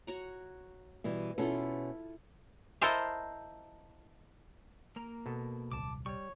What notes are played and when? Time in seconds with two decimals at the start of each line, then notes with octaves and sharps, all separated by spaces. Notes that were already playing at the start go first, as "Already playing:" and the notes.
0.07 F#4 C#5 A#5
1.04 B2 E3 G3
1.38 B2 C#4 E4 F4 A4
2.82 E4 A4 A#4 C5 D#5 F5
4.96 A#3 A#4 A#5
5.26 B2 A4
5.72 D#1 C2 A5 D6
6.06 G3 C#5 C#6